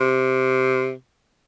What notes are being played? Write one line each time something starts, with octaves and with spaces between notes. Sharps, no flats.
C3